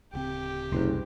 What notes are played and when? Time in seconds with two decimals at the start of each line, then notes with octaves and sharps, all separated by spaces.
0.13 D1 C#3 C4 G4
0.72 F#1 C2 F#2